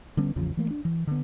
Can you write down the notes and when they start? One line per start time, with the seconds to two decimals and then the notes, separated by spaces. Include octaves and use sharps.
0.17 D3 G3 B3 C#4
0.36 A1 E2 C#3 F3
0.57 E3 A3 A#3
0.71 D4
0.85 E3
1.07 D3 B3